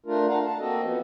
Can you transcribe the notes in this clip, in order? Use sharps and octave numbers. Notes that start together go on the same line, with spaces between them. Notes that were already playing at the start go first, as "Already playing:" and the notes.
A3 D4 F4 A#4
D4 A#4 F5 F#5 A#5
A5
A#3 C4 F#4 A4 D#5
F3 B3